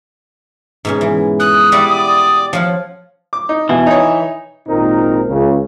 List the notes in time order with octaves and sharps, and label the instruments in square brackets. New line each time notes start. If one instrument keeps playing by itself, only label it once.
[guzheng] G#2 B2 C#4
E3
[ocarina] D#6 [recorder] F#6
[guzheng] G3 E4 F#4 [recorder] D5
[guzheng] F3 F4 F#5 [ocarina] C#5
[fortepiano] D6
D#4
[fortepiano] B2 [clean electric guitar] E3
[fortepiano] D#4 C#5
[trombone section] G#1 A#2 C4 D#4 A#4
C#2 C#3